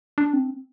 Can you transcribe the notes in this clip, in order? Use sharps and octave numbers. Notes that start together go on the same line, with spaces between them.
D4
C4